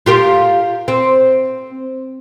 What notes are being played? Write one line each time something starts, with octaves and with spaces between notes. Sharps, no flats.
F4 G4 A#4
C4